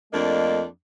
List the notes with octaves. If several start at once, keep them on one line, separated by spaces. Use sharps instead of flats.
F2 A3 A#3 D4 D#5